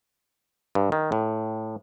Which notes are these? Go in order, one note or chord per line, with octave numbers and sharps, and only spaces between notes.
G2
D#3
A2